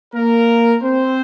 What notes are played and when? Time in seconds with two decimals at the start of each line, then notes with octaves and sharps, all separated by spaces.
0.14 A#3 A#4
0.82 C4 C5